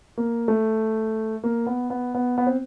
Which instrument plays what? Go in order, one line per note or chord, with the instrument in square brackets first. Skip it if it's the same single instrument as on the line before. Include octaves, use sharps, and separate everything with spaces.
[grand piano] A#3
A3
A#3
B3
B3
B3
B3
C4